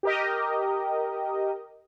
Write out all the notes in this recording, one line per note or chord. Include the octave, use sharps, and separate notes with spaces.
G4 A#4 D#5